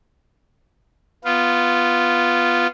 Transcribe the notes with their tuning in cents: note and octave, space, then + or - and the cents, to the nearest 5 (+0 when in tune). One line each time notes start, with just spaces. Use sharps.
B3 -5 F4 -10